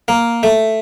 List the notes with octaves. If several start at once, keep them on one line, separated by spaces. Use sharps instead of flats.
A#3
A3